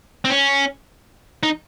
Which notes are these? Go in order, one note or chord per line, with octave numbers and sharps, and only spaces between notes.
C4
C#4
D#4